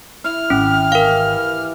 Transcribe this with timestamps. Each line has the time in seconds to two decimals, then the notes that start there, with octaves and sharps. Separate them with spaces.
0.24 E4 F6
0.50 G#1 C#4 G4
0.92 E3 A#4 F5